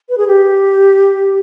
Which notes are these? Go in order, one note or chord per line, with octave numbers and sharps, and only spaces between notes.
B4
G#4
G4